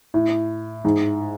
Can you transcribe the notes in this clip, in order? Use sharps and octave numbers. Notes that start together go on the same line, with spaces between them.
A2
G#2